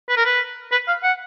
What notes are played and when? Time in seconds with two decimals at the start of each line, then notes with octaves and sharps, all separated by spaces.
0.09 B4
0.17 A#4
0.25 B4
0.72 B4
0.88 F5
1.03 F#5